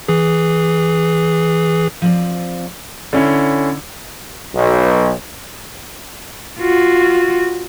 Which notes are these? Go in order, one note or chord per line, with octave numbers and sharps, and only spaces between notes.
E3 G#4
F3 C4 D5
D3 C#4 E4
B1
F4 F#4